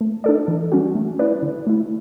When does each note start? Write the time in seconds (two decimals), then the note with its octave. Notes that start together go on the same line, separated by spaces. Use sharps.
0.01 A3
0.24 D4 A4 D5
0.48 E3
0.72 G3 C#4 F#4
0.95 A3
1.19 E4 B4 D5
1.43 D3
1.67 A3 E4